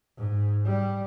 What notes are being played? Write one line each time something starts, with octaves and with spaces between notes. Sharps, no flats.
G#2
G3